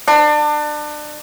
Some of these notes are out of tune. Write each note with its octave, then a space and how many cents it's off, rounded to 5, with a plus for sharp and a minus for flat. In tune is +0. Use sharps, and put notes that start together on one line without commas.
D4 +30